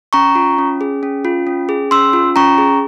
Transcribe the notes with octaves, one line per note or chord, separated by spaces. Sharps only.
C#4 A#5 C#6
F4
C#4
G#4
C#4
F4
C#4
G#4
C#4 C6 E6
F4
C#4 A#5 C#6
G#4